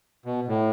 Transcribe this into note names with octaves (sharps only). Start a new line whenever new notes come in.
B2
A2